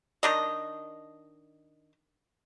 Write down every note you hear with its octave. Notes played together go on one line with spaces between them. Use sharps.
D#3 D4 D#5